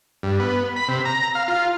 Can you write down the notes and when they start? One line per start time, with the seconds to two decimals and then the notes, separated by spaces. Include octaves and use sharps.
0.23 G2
0.40 B3
0.76 B5
0.88 C3
1.05 A#5
1.35 F5
1.48 F4